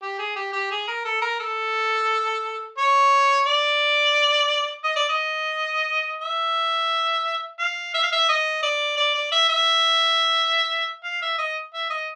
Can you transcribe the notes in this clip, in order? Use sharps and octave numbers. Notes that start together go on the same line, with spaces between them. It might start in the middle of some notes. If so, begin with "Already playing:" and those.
G4
G#4
G4
G4
G#4
A#4
A4
A#4
A4
C#5
D5
D#5
D5
D#5
E5
F5
E5
F5
E5
D#5
D5
D5
D5
E5
E5
F5
E5
D#5
E5
D#5